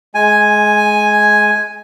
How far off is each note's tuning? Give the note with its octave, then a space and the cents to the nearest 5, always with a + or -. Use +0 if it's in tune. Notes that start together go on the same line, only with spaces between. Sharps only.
G#3 +20 G#5 +0